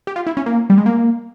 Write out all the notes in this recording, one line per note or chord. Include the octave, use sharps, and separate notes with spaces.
G4
F4
E4
C#4
A#3
G3
G#3
A#3